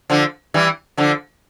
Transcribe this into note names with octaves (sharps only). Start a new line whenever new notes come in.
D3 F3
E3 G3
D3 F3